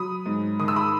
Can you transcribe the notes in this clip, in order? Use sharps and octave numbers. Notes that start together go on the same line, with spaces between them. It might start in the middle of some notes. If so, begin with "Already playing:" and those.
Already playing: F#3 B5 D#6
G#2
D#3 D#6
E6
B5 D#6